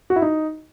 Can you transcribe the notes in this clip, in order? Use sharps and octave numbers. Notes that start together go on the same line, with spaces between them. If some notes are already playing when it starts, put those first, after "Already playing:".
F#4
E4
D#4